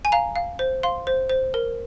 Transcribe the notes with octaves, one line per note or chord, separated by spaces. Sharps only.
G#5
F5 A#5
F5
C5
F5 C6
C5
C5
A#4